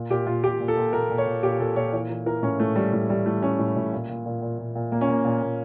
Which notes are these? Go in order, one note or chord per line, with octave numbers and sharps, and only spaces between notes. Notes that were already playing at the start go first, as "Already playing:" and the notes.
Already playing: A#2
A#2 G4
A#2 F4
A#2 G4
A#2
A4
A#2
A#2 A#4
A#2
C#5
A#2
A#2 G4
A#2 A4
A#2 C#5
E3 C#5
E3
E3 A#4
A2 C#4
A2 A3
E3 G3
A2 A3
A2 G3
E3 A3
E3 C#4
A2
A2
A#2
A#2
A#2
A#2
A#2
A#2
A#2 A#3
C#4
A#2 A#3
A#2
A#2